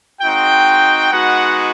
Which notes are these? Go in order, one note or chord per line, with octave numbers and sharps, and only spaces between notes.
G#3 C4 D#4 F#4 G5
G#3 B3 D#4 F#4 F#5